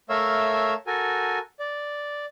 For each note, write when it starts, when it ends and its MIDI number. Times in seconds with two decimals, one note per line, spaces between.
0.09 0.74 57
0.09 0.74 70
0.09 0.74 73
0.09 0.74 76
0.09 0.74 77
0.09 0.74 88
0.87 1.39 66
0.87 1.39 69
0.87 1.39 70
0.87 1.39 80
1.59 2.25 74